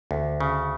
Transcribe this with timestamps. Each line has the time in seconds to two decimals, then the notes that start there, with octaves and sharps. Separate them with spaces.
0.11 D2
0.40 C#3